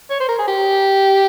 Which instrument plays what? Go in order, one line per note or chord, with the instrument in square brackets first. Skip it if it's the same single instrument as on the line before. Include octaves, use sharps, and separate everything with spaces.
[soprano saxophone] C#5
C5
A#4
G#4
G4